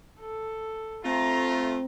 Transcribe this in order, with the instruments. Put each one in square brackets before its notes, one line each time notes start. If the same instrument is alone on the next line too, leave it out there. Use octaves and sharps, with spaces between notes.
[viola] A4
[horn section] A3 F4 [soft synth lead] C4 [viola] A#5